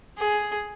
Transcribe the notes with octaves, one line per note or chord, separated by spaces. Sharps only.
G#4